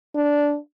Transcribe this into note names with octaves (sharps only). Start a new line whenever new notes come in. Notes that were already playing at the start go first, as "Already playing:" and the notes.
D4